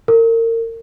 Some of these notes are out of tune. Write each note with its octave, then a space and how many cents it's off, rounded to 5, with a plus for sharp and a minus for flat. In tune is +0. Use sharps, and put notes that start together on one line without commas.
A#4 -30